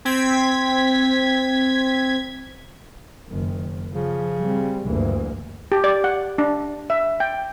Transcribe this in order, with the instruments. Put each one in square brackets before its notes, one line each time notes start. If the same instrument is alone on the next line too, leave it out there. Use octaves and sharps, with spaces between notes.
[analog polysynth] C4 G#6 B6
[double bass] F#1 D#3
[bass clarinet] C#3 [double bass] F3
[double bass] G3 C4
[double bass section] F#1 D2 G2 [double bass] E3 A#3
[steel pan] G4
D5
F#5
D4
E5
G5